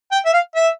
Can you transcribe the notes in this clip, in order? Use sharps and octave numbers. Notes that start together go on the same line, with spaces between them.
G5
E5
F5
E5